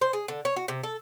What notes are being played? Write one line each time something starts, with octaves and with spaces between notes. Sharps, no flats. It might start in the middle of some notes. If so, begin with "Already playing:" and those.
C5
G#4
D3
C#5
F#4
C3
A4